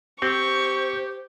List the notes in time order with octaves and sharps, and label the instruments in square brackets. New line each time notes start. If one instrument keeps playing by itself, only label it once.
[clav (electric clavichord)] C4 [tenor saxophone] G4 [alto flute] C5 [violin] C#6